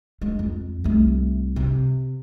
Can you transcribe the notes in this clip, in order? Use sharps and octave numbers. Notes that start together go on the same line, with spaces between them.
G#3
F2
C2 A3
C3